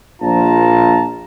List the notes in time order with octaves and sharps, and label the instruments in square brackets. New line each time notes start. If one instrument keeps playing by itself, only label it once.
[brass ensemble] A#1 F4 A5 A#5